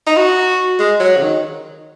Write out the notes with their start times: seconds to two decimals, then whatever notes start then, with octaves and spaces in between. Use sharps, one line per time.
0.06 D#4
0.17 F#4
0.79 G#3
1.00 F#3
1.17 C#3
1.22 D#3